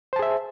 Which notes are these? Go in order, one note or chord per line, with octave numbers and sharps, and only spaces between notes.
G#4 C5 E5 A5